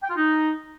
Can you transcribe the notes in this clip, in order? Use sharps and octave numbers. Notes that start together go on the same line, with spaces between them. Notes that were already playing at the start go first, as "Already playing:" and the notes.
G5
F4
D#4